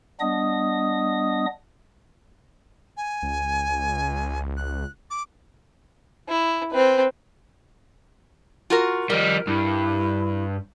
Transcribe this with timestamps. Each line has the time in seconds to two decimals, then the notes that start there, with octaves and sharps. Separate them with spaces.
0.20 G3 B3 D4 D#5 D#6
2.97 G#5
3.23 C#2
4.57 F#6
5.10 D6
6.29 E4
6.71 C4 B4
8.70 F4 F#4 A#4
9.10 F3 G3 A#4 D#5
9.47 G2 E4